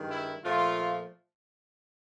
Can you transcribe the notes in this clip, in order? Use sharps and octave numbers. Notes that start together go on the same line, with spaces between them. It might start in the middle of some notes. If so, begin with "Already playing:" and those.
Already playing: G2 D#3 G#3
E4
A#2 F3 A3 F4